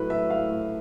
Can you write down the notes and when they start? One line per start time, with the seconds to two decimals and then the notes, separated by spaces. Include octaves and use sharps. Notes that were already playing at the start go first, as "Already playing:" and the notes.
Already playing: A2 F#3 A3 B4
0.10 E5
0.30 A2 F5